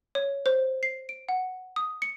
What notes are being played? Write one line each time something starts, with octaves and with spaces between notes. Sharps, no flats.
C#5
C5
C7
D7
F#5
D#6
C#7